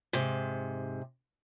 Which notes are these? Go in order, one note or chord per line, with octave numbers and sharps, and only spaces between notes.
G#2 C3